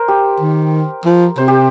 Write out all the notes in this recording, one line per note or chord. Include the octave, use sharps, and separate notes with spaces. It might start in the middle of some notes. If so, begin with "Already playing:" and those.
Already playing: A#4 C5
G4
D#3
F3
C3 C5
G4